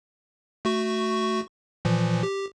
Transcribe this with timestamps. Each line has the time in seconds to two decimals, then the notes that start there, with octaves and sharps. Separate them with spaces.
0.65 A3 F#4 C#6
1.85 A#2 E3 F3
2.23 G4